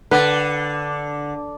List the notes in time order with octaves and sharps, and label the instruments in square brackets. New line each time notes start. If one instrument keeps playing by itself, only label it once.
[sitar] D3 [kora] B4 D5